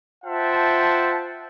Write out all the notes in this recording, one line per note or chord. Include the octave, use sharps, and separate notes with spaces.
F4 C5 E5 F#5 G5 A5